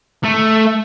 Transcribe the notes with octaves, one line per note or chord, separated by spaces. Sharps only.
A3